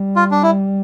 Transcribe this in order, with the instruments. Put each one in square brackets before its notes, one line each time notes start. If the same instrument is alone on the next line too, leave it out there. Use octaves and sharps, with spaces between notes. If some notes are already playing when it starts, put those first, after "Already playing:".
Already playing: [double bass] G3
[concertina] F4
D4
E4